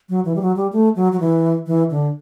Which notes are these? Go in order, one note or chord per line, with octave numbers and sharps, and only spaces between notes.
F#3
E3
G3
F#3
G3
A3
F#3
F#3
E3
E3
D3